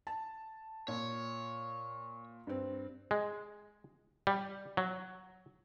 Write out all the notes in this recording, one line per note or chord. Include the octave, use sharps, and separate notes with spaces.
A5
A#2 C#5
G2 C4
G#3
G3
F#3